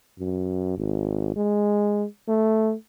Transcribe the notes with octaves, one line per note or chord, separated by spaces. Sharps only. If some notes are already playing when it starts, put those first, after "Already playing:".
F#2
G#1
G#3
A3